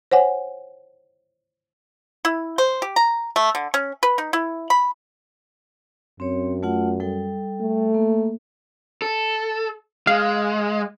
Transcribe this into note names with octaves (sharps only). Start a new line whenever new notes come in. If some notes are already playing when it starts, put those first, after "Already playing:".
C5 C#5 F#5 G#5
E4
C5
G4
A#5
A3
D3
C#4
B4
D#4
E4
B5
F#2 C4 C#5
A3 F4 F#5
G3 A4 G5
A3
A#3
A4
G#3 F5